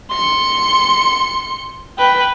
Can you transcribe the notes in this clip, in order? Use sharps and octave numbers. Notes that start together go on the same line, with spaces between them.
C6 C#7
B4 G5